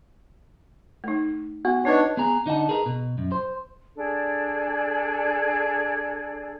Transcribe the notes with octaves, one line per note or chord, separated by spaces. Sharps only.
A3 D#4
B3 F#4
D4 D#4 B4 C#5 D#5
B3 G#4 G#5 A#5
D3 D#4 D#5 F#5 A5
G#4 A#4 B4 A#5
B2
F#2
C5
D4 G#4 A4 D5